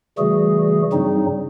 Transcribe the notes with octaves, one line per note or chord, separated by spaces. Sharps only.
C#3 E3 G3 A3 F#4 G#4
G2 C#3 F#3 G3 C4 D#4